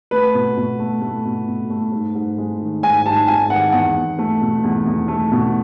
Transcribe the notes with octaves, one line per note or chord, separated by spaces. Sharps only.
A3 B4
B2
B2
A3
A3
B2
B2
A3
G#2
G#2
G#3
D#3
G#2 G#5
G#2 A5
G#3 G#5
D#3 F#5
E2 F#5
E2
A3
B2
E2
E2
A3
B2